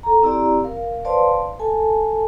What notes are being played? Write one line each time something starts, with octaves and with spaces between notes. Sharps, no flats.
A4 A#5
C4 E4 G4 D5 A#5
A#4 F5
B4 C5 D5 F5 A5 C6
A4 G#5 A5